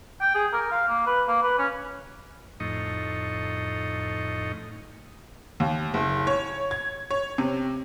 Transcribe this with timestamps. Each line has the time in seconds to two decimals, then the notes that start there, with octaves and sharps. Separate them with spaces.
0.21 G5
0.35 G#4
0.53 A#4
0.71 F5
0.88 A#3
1.06 B4
1.28 A#3
1.43 B4
1.58 C#4
2.60 F2 A2 D#4 D#5 C#6
5.60 D#2
5.94 F#1
6.27 C#5
6.71 G#6
7.11 C#5
7.38 C3